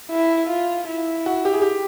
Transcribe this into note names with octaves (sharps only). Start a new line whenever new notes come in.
E4
F4
E4
F#4
G4
G#4
G4